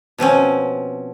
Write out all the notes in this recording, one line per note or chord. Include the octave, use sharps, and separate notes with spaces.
B2 F3 C4 C#4